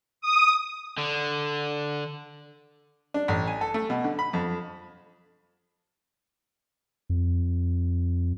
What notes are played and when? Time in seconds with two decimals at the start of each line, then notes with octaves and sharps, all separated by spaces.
0.21 D#6
0.98 D3
3.14 D4
3.28 A1
3.47 G#5
3.61 A4
3.74 A3
3.90 B2
4.04 D3
4.19 B5
4.33 F2
7.10 F2